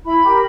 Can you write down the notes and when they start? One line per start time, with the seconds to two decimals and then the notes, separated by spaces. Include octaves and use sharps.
0.04 E4 B5
0.23 G4 A#4